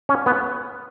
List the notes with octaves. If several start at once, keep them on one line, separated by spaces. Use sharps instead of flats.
C#4
B3